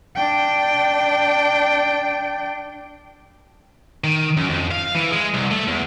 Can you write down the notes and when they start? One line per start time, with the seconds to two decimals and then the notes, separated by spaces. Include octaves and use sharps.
0.16 D4 G5
4.04 D#3
4.37 F#2
4.49 F2
4.71 F5
4.95 E3
5.12 G#3
5.34 C2
5.51 A3
5.68 E2